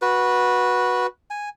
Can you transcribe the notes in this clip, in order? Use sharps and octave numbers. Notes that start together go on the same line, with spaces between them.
F#4 B4
G#5